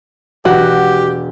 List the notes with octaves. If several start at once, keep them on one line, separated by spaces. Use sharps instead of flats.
E1 F#4 G4